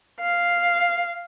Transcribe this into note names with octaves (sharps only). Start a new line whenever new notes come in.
F5